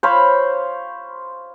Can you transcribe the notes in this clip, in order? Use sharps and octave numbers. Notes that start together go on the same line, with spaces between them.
C5 C#5 F5 B5